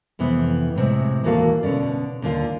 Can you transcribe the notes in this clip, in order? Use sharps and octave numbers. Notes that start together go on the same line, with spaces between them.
F2 C3 E3 B3 E4
A2 C3 G#3
D#2 E3 A#3 F#4 A4 F5
B2 D3 C#4 D5
D#2 D3 F4 F5